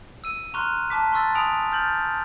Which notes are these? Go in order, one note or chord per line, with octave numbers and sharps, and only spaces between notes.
E6 D#7
A#5 C6 C#6 F6 F#6
A5 D6 B6
C6 C#6 E6 A6
G#5 B5 D#6 D7 F7
F6 G6 A6 F#7